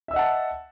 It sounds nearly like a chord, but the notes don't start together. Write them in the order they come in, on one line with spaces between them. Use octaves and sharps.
E5 E6 D#5 F#5 A5